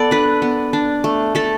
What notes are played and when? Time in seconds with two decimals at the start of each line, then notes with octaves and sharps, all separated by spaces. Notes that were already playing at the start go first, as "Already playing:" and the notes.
Already playing: B3 A4 D5
0.11 D4 B4
0.42 B3
0.73 D4
1.04 A3
1.35 A3 A4